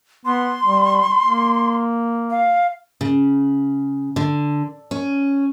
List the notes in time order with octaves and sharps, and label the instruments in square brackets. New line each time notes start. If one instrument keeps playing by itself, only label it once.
[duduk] B3 [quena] C6
[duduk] G3
A#3
[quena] F5
[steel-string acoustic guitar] C#3
D3
C#4